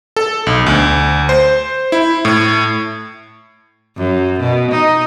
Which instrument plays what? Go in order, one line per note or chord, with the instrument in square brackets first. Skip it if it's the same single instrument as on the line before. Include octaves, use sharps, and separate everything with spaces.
[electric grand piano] A4
B1
D2
C5
E4
A2
[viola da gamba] F#2
B2
D#4